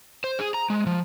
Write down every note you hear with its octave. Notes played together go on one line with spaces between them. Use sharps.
C5
G#4
A#5
G#3
F3